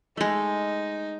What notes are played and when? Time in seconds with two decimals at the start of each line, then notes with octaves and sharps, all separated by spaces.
0.17 G#3 A3 D#4